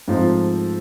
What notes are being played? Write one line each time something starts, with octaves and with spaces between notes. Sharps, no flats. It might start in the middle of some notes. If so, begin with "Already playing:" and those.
G#2 F3 A3 C4 F4